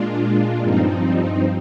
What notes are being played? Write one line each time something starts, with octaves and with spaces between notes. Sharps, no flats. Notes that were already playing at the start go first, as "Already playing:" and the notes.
Already playing: A#2 G#3 D4 F4
G2 F3 C4 D#4